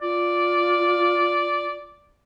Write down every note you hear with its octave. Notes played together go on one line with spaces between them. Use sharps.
F4 D5